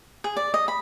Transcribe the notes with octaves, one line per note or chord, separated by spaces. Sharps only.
G#4
D5
D#5
B5